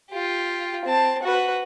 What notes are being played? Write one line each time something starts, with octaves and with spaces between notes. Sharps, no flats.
F4 G4
C4 A5
F#4 B4